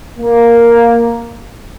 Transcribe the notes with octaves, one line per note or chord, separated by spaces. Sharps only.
A#3